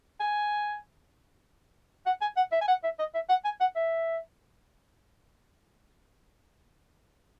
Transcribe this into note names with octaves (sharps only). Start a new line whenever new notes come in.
G#5
F#5
G#5
F#5
E5
G#5
F#5
E5
D#5
E5
F#5
G#5
F#5
E5